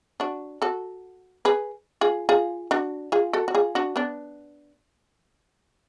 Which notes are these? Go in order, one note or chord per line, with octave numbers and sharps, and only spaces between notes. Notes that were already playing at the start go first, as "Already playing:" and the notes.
D4 F#4
F#4 A4
G#4 B4
F4 G#4
F4 G#4
D4 F#4
F4 G#4
F#4 A4
F#4
F4 G#4
D4 F#4
B3 D4